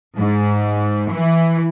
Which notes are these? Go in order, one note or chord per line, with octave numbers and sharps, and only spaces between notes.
G#2
E3